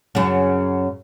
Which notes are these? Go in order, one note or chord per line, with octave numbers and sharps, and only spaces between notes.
F#2 C#3